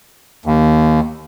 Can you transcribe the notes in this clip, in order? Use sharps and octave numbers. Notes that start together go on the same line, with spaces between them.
D#2